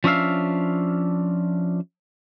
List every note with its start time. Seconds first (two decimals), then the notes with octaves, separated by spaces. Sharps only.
0.04 F3 C#4 D4 E5 F5